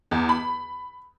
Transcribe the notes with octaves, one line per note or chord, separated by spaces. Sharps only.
E2
B5